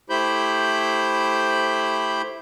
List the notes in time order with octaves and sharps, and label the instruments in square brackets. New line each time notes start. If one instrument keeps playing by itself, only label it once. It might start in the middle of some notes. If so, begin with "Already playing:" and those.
[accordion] A3 E4 G4 C5 B5 G6